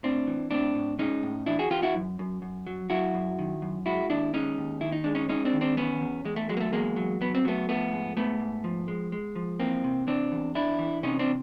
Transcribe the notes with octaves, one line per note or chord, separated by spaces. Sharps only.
A2 C4 D4
E3
A2 C4 D4
A2
G#3 C#4 D#4
A2
E3 D4 E4
F#4 G#4
E3 F4 G4
E4 F#4
F#2
F#2
F#2
F#3
F#3 E4 F#4
F#2
D#3
F#2
G#3 E4 F#4
D#2 D4 E4
G#3 C#4 D#4
D#2
D#3 E4
D#4
G#3 D4
C#4 D#4
G#3 C#4 D#4
C4 D4
D#3
C4 D4
E2 B3 C#4
E2
E2 G#3
A3
F#3 G#3
A#3
A3
E2 G#3 A#3
F#3
F#3 B3
C4
F#3 A3 B3
F3 A3 B3
G#2
G#2 A3 B3
G#2
F3
G#3
G#3
F3
E3 A#3 C4
C3
E3 C4 D4
E2
E3 D4 E4
E3
C3 C#4 D#4
C4 D4